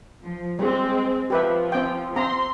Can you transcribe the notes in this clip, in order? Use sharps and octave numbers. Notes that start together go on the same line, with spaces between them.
F3
G3 G#3 C4
F3 G4 B4 E5
C4 G5
C4 A#5 C6